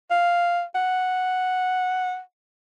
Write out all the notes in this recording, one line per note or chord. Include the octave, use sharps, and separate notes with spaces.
F5
F#5